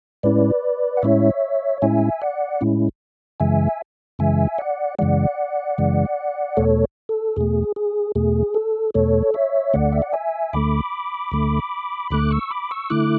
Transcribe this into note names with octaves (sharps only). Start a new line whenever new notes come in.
A2 G#3 C#4 E4 B4 D5
F#5
A2 G#3 C#4 E4 C#5 E5
A2 G#3 C#4 E4 E5 G#5
D5 F#5
A2 G#3 C#4 E4
F#2 C#3 E3 G#3 E5 G#5
F#2 C#3 E3 G#3 E5 G#5
D5 F#5
F#2 C#3 E3 G#3 D5 F#5
F#2 C#3 E3 G#3
E2 B2 A3 A4 C#5
A4
E2 B2 A3 G#4
G#4
E2 B2 A3 G#4
A4
E2 B2 A3 A4 C#5
C#5 E5
D2 D3 A3 D5 F#5
E5
F#5
E5 G#5
D2 D3 A3 B5 D6
D2 D3 A3
D2 D3 A3 D6 F#6
C#6 E6
B5 D6
C#6 E6
D3 A3 E4 D6 F#6